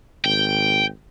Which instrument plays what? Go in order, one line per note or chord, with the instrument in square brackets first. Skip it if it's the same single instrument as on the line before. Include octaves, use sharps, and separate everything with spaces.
[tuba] G#1 [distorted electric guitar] G5